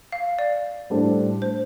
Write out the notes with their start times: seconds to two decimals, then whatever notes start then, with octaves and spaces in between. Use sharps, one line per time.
0.12 F5
0.39 D5
0.90 A2 G3 D4 A4 C5
1.42 C5